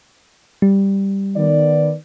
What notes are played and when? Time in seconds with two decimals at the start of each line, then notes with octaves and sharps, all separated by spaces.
0.62 G3
1.36 D#3 B3 D5